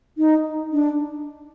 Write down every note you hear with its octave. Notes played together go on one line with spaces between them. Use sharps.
D#4
D4